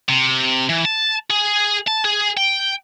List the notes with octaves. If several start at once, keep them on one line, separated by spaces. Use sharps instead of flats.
C3
E3
A5
G#4
A5
G#4
G5